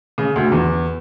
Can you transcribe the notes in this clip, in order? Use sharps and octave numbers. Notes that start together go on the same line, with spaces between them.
C#3
D2
E2